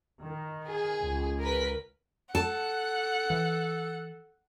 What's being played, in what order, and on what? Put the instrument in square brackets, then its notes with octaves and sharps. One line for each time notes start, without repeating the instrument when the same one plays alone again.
[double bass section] D#3
[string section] G#4
[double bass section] C#2
[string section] A#4 B4 B6
[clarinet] A4 [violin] F#5 [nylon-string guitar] A5
[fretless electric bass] E3